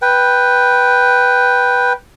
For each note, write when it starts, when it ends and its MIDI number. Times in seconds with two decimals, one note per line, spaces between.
0.02 1.93 71
0.02 1.93 79